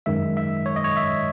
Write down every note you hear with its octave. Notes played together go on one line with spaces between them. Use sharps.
F#2 D#3 G#3 E5
E5
C#5
D#5
C#5
E5